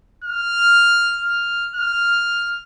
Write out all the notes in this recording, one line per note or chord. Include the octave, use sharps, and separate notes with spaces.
F6
F6
F6